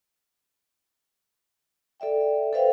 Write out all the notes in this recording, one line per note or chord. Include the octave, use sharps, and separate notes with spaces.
A4 D5 E5 G5
A4 B4 C5 E5 F5 G5